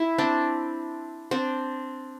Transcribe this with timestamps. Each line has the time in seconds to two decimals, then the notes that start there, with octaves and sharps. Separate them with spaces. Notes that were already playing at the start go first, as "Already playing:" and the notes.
Already playing: E4
0.18 C4 D4
1.31 C4 D4